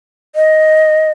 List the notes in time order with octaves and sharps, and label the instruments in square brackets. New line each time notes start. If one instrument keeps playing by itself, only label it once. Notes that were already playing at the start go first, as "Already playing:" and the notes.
[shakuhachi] D#5